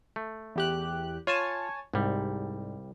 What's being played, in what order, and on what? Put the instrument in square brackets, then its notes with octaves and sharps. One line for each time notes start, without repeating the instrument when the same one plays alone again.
[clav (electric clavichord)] A3
[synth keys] E2 G4 F#6
[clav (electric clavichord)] F4 [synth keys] C#5 G#5 A5
[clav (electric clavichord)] C2 G3 [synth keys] G#2